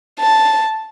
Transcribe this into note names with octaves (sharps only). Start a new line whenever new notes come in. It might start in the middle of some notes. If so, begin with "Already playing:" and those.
A5